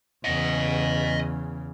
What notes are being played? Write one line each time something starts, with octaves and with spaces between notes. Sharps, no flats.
E2 C#3 D#5 F#5